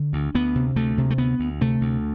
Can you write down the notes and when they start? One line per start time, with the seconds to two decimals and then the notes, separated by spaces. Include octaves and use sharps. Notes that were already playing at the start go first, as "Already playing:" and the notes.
Already playing: D3
0.13 D2
0.35 D2 B3
0.55 C3
0.76 D2 A3
0.98 C3
1.10 A3
1.18 D2 B3
1.39 D2
1.61 C3 A3
1.81 D2